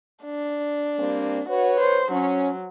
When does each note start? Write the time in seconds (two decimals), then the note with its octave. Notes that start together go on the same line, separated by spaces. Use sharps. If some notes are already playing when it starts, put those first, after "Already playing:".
0.25 D4
0.99 G3 A#3 C4
1.49 F#4 B4 C#5
1.80 C5
2.12 F#3 C#4